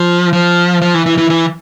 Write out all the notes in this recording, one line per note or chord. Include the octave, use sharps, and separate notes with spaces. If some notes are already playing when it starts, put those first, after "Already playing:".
Already playing: F3
F3
F3
E3
E3
E3
E3